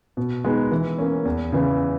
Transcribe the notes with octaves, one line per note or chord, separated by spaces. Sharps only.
B2
G#3 B3 D#4
E3
A#3 C#4
E2
C#3 E3 B3